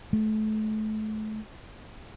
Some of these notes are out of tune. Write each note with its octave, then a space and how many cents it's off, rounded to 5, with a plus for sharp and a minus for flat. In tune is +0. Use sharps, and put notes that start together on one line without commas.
A3 -30